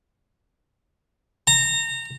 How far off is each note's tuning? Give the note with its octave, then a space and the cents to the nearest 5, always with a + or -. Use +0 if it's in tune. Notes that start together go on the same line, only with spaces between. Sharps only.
A#5 -25